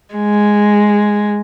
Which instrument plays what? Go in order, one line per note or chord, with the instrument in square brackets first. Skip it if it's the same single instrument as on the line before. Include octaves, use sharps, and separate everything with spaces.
[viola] G#3